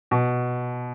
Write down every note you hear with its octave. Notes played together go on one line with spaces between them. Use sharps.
B2